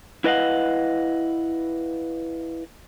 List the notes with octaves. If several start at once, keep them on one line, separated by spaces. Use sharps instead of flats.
E4 B4 D#5 F5 F#5